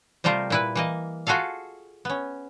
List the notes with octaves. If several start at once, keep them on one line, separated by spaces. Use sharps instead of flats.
C3 G3 A3 F4 A#4 C5
A#2 E4 B4
E3 A#3 D#5
F4 F#4 G#4 A4 F5
B3 C#4